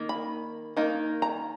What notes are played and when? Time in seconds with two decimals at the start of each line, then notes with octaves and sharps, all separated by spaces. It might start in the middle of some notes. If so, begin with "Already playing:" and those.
Already playing: D#3 A#3
0.09 B5
0.77 D#3 A#3 D#4
1.22 A#5